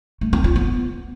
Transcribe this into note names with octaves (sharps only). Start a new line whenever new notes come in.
A3
C4
F4
B3